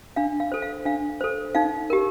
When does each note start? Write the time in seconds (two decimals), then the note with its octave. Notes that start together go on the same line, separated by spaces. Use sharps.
0.16 D4 F5
0.40 F5
0.52 A4 C5
0.62 F5
0.85 D4 F5
1.21 A4 C5
1.55 D#4 F5
1.90 G4 A#4